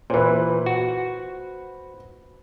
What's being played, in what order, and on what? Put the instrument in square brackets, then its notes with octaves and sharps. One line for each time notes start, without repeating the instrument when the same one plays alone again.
[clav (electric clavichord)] A#2 E3 [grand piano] B4 C5
[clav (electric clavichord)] F#4